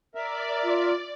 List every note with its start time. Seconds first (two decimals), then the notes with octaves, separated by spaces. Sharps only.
0.15 A#4 D5 E5
0.64 F4